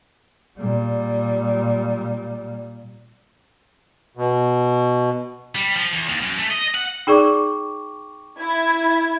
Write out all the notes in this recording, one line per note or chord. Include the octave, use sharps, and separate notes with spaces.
A#2 G3
B2
G3
F3
E2
D#2
F#2
A3
D#5
F#5
D#4 G#4 D5 G5 C#6 D6
E4 G#6